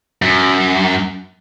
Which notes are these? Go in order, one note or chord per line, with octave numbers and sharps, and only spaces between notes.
F#2